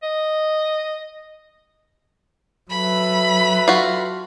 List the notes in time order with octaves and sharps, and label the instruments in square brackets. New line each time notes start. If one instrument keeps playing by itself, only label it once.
[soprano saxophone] D#5
[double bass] F#3 [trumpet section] A4 B4 E5 [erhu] B5
[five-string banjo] F4 F#4